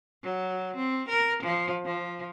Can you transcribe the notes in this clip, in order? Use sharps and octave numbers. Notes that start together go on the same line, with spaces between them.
F#3
C4
A#4
F3
F3